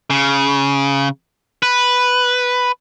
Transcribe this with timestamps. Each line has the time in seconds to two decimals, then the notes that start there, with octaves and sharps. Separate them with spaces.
0.10 C#3
1.63 B4